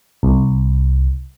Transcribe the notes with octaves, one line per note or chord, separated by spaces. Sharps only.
C2